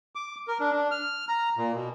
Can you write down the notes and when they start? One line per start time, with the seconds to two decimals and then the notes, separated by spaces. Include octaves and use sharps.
0.15 D6
0.48 A#4
0.60 D4
0.72 D4
0.91 F6
1.29 A#5
1.57 A#2
1.74 B2